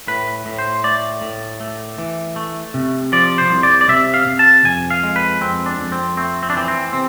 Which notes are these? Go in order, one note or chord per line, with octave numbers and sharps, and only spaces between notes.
A2 B4
A2
C5
A3 D5
A2
A3
E3
A3
C3
F3 D5
C5
C2
D5
D5
C3 E5
F5
C3
A5
F2 G#5
F5
G#3
B4
F2 C4
D4
F2
C4
A3 C4
C4
D4
E3 C4
C4
C3 C4